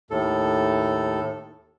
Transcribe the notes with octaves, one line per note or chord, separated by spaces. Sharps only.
D#2 A2 A4